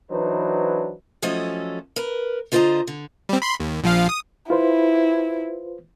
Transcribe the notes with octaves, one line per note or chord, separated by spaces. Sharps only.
E3 F#3 D4 D#4 B4 C5
F3 F#3 A3 C#4 A4 D#5
A#4 B4
D3 F4 C5 D5 D#5 A#5
D3
G3 C4
B5 C6
D#2
A#1 F3 F5
D#6
E4 F4 B4 C5